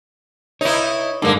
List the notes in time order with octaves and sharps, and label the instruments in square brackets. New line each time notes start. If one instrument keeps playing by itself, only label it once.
[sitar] D#4 E4 [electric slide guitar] C#5 D#5
[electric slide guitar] G2 G#3 D#4 [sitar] D3 A#3